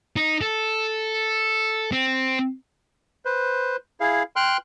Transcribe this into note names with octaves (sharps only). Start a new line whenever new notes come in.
D#4
A4
C4
B4 C5
E4 G#4 F5
G5 C6 F6 F#6